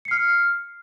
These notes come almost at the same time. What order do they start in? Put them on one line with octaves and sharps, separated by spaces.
C#7 C7 F6